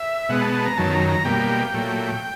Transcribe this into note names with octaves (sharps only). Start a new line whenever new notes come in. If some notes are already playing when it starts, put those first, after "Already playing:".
Already playing: E5
B2 G#3 B3 F#5
A5
A5
A#5
F#2 D#3 F#3 A5
A#5
A#5
B2 G3 A#3 G5
A#2 F#3 A3